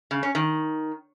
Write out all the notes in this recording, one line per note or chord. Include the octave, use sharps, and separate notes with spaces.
C#3
C#4
D#3